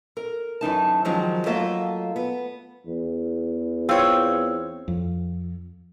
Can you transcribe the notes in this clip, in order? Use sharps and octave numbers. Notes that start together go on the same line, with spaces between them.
A#4
F#2 E3 D#4 A5
D#3 F3 F#3 G#3
F#3 A3 A#3 F4 D#5 E5
B3
E2
C4 F4 C#5 E6
F2